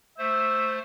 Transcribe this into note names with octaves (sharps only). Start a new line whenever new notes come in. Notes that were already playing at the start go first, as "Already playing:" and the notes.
A3 C5 E5